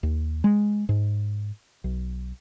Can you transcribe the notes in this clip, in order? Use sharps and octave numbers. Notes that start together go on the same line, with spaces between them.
D#2
G#3
G#2
B1